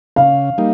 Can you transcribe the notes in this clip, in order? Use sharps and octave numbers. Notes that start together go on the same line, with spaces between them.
C#3 F5
G3 A#3 D#4